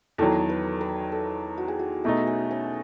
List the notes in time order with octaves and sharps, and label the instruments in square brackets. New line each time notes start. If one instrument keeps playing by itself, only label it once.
[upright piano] E2 D#3 F#3 [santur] A4
[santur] B4
B4
A4
F#4
G#4
F#4
[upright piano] B2 A3 D#4 [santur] E4
[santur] C#4
C#4